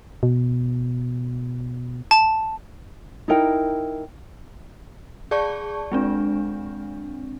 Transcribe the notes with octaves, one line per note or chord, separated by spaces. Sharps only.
B2
A5
D#4 E4 A#4 G5
G#4 D5 A5 C#6
G#3 C4 D4